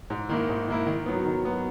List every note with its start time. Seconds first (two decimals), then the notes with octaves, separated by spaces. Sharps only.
0.10 G#2
0.29 D#3 A#3 E4
0.49 G#2
0.67 D#3 A#3 E4
0.87 D#3
1.06 F#3 B3
1.25 D#3
1.45 F#3 B3